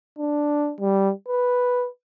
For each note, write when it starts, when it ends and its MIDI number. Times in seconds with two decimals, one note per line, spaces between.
0.19 0.72 62
0.80 1.11 55
1.28 1.87 71